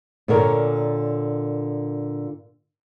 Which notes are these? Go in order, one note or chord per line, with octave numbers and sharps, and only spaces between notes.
A#2 D3 A#4 C#5